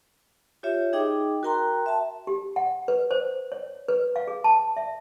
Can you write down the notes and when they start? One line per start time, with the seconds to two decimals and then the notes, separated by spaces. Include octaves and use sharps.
0.63 F4 G4 C#5 E5
0.93 D#4 G#4 D#5 G5 D6
1.43 F#4 A#4 G5 A#5 C6
1.86 E5 A5
2.27 G4
2.56 F#5
2.88 B4
3.11 C5
3.52 C#5
3.88 B4
4.16 F5
4.27 G#4
4.44 A5
4.77 E5